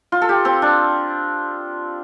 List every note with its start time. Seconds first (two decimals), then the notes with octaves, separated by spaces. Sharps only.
0.12 F4
0.21 A4
0.29 G4
0.45 C4
0.62 D4